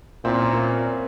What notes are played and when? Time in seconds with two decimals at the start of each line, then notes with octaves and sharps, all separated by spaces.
0.24 A#2 C4 E4
0.39 A#3 C#4
0.53 A#3 C#4